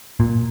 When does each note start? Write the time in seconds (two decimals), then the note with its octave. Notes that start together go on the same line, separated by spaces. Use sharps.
0.20 A#2